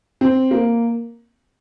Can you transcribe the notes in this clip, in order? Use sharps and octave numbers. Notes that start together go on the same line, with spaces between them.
C4
A#3